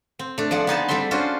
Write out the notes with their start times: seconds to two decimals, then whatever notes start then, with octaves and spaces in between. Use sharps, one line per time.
0.19 C4
0.38 A3 D4
0.51 F3 G#4 D5 F#5
0.67 B3 D#4 G#4 A5
0.88 G3 C4 A4 E5 C6
1.11 C#4 D4 F4 F#4 C5